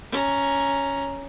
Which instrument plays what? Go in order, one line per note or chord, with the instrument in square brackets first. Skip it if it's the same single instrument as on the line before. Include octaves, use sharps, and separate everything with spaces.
[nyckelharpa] C#4 A#5